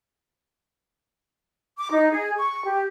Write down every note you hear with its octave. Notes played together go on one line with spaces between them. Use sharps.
D6
D#4
G#4
C#6
G4